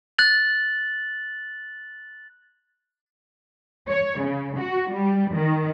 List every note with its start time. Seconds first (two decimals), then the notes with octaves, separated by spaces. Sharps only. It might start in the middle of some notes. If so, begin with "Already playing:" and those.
0.18 F#6 A6 F#7
3.89 C#5
4.22 C#3
4.58 F#4
4.93 G3
5.35 D#3